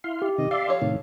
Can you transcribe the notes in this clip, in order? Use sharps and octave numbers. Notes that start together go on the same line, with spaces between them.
E4 F5 C6
G4
C3 D#3 D#5
D5 E5 F5 C6
F3 A4 C#5
A2 C3 D#3